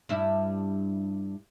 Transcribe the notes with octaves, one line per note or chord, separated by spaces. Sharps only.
G2 E4